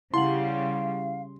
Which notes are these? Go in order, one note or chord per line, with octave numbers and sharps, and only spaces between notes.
C#3 G3 E4 F5 F#5 C6 F#7